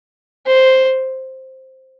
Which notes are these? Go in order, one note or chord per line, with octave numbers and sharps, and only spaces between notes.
C5